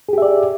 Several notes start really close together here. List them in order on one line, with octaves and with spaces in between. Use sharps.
G#4 G4 E5 D5